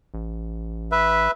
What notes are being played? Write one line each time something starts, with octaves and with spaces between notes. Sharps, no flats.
A1
B4 E5